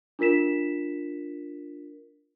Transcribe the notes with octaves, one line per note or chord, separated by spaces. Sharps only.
D4 F4 A#4 B6 E7